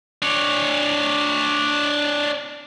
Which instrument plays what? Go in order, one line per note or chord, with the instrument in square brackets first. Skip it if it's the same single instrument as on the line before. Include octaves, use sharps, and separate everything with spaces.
[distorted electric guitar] D4 C#5